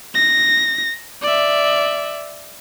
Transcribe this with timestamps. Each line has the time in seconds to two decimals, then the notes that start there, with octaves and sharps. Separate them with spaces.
0.15 A#6
1.22 D5 E5